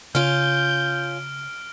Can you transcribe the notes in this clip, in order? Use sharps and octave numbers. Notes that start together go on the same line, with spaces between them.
C#3 C#4 F4 F6 G6 D7